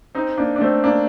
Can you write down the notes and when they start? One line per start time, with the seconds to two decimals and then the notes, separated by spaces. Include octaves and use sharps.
0.15 C4 D#4
0.38 A#3 D4
0.56 D4
0.61 A3 C4
0.83 A#3 D4